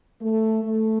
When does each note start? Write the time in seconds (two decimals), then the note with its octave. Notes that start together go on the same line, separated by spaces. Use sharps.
0.21 A3
0.64 A3